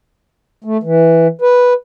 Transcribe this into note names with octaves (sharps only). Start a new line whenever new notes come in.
A3
E3
B4